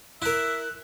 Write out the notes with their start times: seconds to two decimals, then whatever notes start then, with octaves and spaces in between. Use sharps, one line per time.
0.22 E4 A#4 E5 F#6